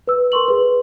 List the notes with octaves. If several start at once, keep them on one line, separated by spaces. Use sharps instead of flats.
B4 E6
A#4 C6 C#6 F#7
G#4 B4